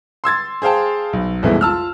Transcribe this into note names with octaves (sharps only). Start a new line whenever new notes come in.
C6 E6 G#6 A6
G#4 C5 F5 G5 A5
B1
C2 F2 B2 E3 G#3 A3
F4 A5 E6 F6